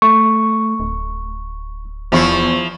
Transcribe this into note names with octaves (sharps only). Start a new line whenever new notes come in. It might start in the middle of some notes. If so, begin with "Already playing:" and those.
A3 C#6
D1
E2 F3 E4 C#6 C7